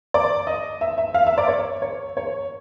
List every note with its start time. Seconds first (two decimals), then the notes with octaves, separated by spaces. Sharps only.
0.14 D5
0.47 D#5
0.81 E5
0.98 E5
1.14 F5
1.26 E5
1.38 D5
1.48 C#5
1.82 C#5
2.17 C#5